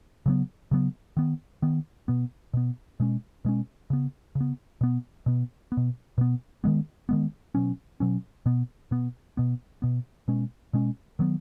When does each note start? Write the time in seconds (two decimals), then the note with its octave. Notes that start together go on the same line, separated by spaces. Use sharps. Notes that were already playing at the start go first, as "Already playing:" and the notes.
0.26 C#3 F#3 B3
0.71 C#3 F#3 B3
1.17 D#3 B3
1.62 D#3 B3
2.08 B2 B3
2.54 B2 B3
3.00 B2 G#3 C#4
3.45 B2 G#3 C#4
3.90 C#3 B3
4.35 C#3
4.41 B3
4.81 B2 B3
5.26 B2 B3
5.72 B3
5.77 B2
6.18 B2 B3
6.64 D#3 G#3 B3
7.09 D#3 G#3 B3
7.55 B2 F#3 C#4
8.00 B2 F#3 C#4
8.46 B2 B3
8.91 B2 B3
9.37 B2 B3
9.82 B2 B3
10.28 B2 G#3 C#4
10.73 B2 G#3 C#4
11.19 D#3 F#3 B3